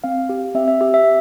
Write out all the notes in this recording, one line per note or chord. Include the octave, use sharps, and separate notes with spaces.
C4 F5
G4
C4 E5
E5
G4 E5
E5